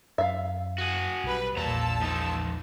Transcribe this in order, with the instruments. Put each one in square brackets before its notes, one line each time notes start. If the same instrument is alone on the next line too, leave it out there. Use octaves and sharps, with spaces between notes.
[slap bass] F#2 [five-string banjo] E5 F5
[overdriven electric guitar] F#4 G#4
[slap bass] B1 [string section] G3 B4
[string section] A#1 A5 E6 [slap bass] E2 G3 [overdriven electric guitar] A#2 A#5
[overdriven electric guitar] F3 D#4